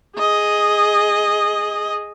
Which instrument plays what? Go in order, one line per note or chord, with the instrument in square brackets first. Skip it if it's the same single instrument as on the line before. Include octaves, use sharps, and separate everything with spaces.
[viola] G#4 D#5